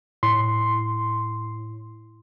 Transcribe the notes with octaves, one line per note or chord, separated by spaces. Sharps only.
A2 C6